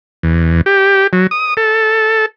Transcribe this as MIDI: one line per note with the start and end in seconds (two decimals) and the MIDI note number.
0.23 0.61 40
0.66 1.07 67
1.13 1.27 54
1.31 1.54 87
1.57 2.26 69